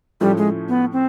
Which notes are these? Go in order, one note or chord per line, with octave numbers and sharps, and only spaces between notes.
A2 F3 G3 A3 C#4
G#3
B3
C4